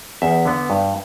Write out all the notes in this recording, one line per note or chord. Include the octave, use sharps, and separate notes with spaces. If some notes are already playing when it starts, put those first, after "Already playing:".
E2 E5
D3 B3
G2